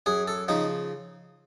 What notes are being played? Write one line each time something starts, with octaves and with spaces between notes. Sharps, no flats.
F#2 G#4
A4
C#3 F3 D#4